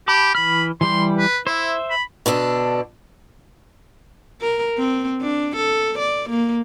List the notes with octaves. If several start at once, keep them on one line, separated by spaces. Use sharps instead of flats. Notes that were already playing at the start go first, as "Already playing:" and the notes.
G4 A5 B5 D6
E3 B5 F6
E3 G3 G4 C6
B4
E4 C5 E5
B5
B2 D3 D4 A4
A#4
C4
D4
A4
D5
A#3